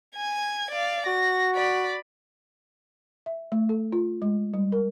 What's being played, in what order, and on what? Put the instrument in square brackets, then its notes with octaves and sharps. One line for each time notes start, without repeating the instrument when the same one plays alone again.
[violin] G#5 G#6
D5 F5
[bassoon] F#4 [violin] A#6
[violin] D5 B5
[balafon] E5
A3
A4
F4
G#3
G3
A#4